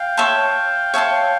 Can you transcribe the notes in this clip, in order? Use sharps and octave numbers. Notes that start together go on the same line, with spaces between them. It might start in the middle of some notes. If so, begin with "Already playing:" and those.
Already playing: F5 G5
C#5 E5 A5 C6
C#5 E5 A5 C6